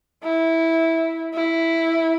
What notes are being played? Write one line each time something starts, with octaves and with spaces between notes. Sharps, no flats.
E4
E4